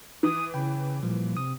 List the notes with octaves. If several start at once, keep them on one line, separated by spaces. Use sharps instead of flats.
E3 D#6
C#3 G5 B5
A#2 F3 G3
C3 D#6